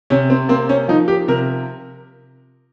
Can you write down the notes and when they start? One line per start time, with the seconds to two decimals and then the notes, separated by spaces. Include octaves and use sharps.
0.10 C3 C#4
0.30 C4
0.49 A#3 C4
0.69 C#4
0.88 F3 D#4
1.08 G4
1.28 C3 A#4